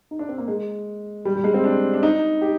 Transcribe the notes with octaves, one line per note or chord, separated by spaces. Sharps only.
D#4
D4
C4
A#3
G#3
G3
G3
G#3
C4
D4
D4
D#4
G4